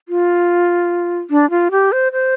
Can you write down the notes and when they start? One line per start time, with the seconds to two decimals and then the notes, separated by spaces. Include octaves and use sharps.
0.09 F4
1.30 D4
1.50 F4
1.71 G4
1.92 C5
2.12 C5